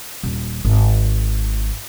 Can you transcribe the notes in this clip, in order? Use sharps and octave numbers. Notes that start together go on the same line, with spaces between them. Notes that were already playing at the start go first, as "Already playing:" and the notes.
D#1
G#1